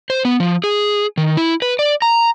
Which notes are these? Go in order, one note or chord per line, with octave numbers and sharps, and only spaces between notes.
C5
B3
F3
G#4
D#3
E4
B4
D5
A#5